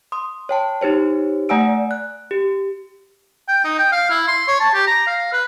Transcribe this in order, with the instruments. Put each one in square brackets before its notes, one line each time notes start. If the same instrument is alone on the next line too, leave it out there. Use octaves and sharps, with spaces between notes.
[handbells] C6 D#6
C#5 G5 A5
D#4 G4 C5 C#5
A3 D5 F#5 G#5 E6 D7
F#6
G4
[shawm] G5
D#4
G5
F5
E4
C6
C#5
A5
G4
A#5
F5
B4